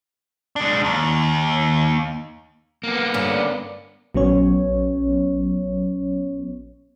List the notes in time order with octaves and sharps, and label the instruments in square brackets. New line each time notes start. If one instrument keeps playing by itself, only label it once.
[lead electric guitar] G#3 D4
D#2
[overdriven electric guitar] A#3 B3
[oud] G2 D3 C#4
[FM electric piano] A#1 F#3 B3 C#4 C#5